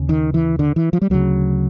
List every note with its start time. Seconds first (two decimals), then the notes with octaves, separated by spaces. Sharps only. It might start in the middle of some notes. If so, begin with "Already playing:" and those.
Already playing: D#2 C#3
0.09 D#3
0.34 E3
0.59 D3
0.76 E3
0.93 F3
1.02 G3
1.10 D2 C#3 F#3